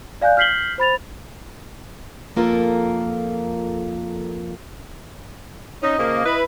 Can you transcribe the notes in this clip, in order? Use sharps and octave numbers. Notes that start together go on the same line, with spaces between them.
D5 F5 G#5 F#6 G6
F6 G6 B6 C7 F#7 G7
C5 B5 A6 F7
F2 A#3 F4 A4 A#4
C#4 D#4 D#5
C#3 F3 A#3
E4 B4